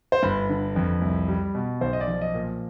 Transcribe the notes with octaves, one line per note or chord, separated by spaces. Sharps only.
C5
G1 B4
D3
F2
C2
G3
B2
B1 C5
D#5
D5
F3
D#5
A#2